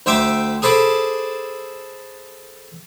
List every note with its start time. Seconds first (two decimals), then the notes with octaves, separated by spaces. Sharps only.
0.06 D2 C5 E5 G5 D6
0.62 G#4 A4 C5 B5 D6